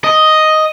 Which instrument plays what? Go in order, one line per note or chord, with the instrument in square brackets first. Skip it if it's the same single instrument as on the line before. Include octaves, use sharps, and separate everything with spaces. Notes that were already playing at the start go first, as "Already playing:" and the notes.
[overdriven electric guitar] D#5